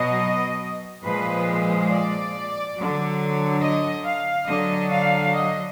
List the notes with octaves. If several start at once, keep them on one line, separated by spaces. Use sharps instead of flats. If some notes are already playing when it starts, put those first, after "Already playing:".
Already playing: B2 F#3 D#5
A#2 F3 G#3 B4
D5
D3 F#3
D#5
F5
D3 F#3 D#5
F5
D#5